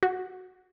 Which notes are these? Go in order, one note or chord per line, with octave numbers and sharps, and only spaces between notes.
F#4